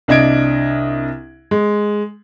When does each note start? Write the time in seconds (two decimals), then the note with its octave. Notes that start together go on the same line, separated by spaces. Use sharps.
0.08 C2 D4 D#5 G#6 D7
1.51 G#3